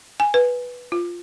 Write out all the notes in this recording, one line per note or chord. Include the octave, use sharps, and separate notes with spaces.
G#5
B4
F4